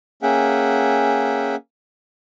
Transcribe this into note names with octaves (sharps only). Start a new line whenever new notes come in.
A#3 C#4 G#4 E5 F#5 G5